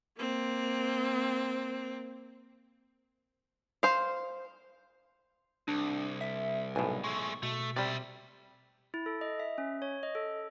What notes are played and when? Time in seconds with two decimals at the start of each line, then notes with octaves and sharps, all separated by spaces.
0.17 A#3 C4
3.83 C5 F5
5.68 C2 D4
6.21 E5
6.76 B1 A2 G#5
7.04 G#3 A3 C#6
7.43 B2 A3
7.77 C3 G3 D5 E5
8.94 E4
9.06 A4
9.21 D#5
9.40 E5
9.58 C#4
9.82 C#5
10.03 D#5
10.15 A4